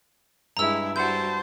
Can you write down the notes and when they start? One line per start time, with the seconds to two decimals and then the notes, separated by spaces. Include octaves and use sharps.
0.57 G2 G#3 E4 A#5 E6
0.96 G3 F#4 C5 F#5 A5 G6